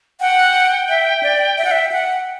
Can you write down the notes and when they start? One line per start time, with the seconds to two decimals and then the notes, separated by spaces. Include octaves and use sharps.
0.20 F#5 G5
0.89 E5
1.23 D5
1.58 E5
1.65 F#5
1.71 E5
1.92 F#5